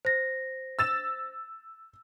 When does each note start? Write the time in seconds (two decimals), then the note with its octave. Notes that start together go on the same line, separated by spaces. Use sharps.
0.05 C5 A#6
0.79 E6 A6 E7